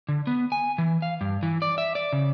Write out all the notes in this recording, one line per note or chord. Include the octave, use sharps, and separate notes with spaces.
D3
B3
G#5
E3
F5
G2
E3
D5
E5
D5
C#3